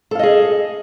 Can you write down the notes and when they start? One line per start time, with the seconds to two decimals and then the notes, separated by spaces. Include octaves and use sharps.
0.11 A4
0.15 F5
0.19 D#5
0.23 G#4